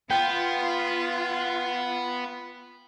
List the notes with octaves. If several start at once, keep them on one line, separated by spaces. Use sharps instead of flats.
B3 F4 G5